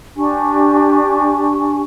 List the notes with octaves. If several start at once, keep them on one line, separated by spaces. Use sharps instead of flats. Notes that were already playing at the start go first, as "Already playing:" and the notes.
D4 G4 G#5 C#6